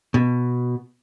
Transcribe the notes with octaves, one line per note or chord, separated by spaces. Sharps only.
B2